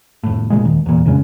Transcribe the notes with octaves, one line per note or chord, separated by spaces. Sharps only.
F1 A2
G1 A#2 G#3
D#2
E2 A#2
F2 C#3 G#3 C#4